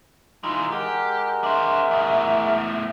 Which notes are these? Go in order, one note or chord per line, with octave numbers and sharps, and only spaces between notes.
E3 G#3 D#4 F4 A#5
G#3 G4 A#4 F#5
D4 C5 E5
E2 A2